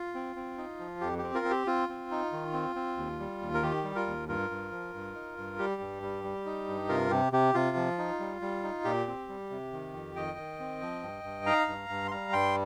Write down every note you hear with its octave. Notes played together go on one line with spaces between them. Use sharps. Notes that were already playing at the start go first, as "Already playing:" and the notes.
Already playing: F4
C4
C4
D#4
F3
F2 G4
G4
C4
F4 A#4
C4
G4
C4 F4
C4
D#4
D#3
C4
C4
D#2
G3
D#2
A#4
D#3 G4
G3
F4 A#4
D#2
G2 F4 A#4
G2
F3
G2
D#4
G2
G3 G4
G2
G3
G3
D#4
G2
C3 F4 A#4
C3 G4
C3 G4
C3 F4
F3
D#4
G3
G3
D#4
A#2 G4
C4
G3
C3
D#3
F2
D#3 D#5 G5
D#3
C4
F3
G2
G2
D#4 F5 A#5
G2
G2
C6
G3 F5 A#5
G2 G5 C6